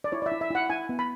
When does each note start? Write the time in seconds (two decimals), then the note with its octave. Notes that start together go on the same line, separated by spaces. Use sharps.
0.04 D5
0.12 E4 C#5
0.22 D5
0.26 E5
0.32 E4
0.41 E5
0.51 E4 F#5
0.70 E4 G#5
0.89 B3
0.99 B5